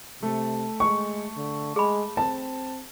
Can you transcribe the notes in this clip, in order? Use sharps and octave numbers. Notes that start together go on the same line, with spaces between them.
C3 A3 A4
G#3 C#6
D3
G#3 G#4 B5
C4 A5